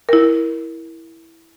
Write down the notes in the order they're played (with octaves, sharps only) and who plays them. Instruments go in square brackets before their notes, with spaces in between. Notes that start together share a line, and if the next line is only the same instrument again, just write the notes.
[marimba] E4 A#4